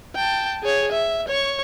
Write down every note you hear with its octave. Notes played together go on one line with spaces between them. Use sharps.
G5 A5
G#4 C#5
E5
C#5 C#6